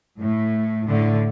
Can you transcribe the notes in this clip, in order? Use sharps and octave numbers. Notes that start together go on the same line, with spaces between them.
A2
A2 D3